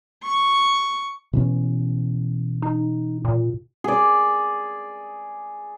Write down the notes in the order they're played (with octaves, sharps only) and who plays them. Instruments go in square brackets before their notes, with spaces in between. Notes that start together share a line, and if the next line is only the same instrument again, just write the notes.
[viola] C#6
[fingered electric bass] B2 E3 C#4
[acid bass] D#4
A#2
[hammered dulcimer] G#4 D5